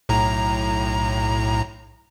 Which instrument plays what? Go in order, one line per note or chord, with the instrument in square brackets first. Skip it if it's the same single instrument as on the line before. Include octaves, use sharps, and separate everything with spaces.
[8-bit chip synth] B1 A2 A#5